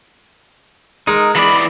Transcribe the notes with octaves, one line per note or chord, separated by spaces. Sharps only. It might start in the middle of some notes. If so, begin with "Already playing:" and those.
G#3 D#4 A#4 C6
E3 D5 B5